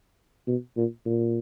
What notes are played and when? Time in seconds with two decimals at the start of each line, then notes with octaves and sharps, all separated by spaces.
0.47 B2
0.77 A#2
1.06 A#2